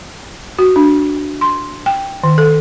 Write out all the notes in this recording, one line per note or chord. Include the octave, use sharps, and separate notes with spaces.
F#4
D4
C6
G5
D#3
A4